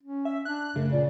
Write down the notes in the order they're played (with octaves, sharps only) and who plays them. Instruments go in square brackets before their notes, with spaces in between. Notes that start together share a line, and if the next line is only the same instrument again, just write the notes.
[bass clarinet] C#4
[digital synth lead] E5
[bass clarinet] D4 [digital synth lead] F#6
[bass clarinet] F#2 [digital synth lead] C#3 [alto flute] A3
[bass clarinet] A#2 [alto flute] D5